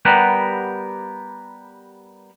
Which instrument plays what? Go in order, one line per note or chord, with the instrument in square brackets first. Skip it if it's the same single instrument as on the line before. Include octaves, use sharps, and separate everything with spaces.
[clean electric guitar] G3 B3 G4 A#4 F#5